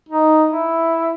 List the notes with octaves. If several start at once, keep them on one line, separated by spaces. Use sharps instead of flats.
D#4
E4